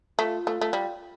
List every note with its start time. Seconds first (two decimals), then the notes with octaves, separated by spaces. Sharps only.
0.19 A3 F4
0.47 A3
0.61 A3
0.73 G3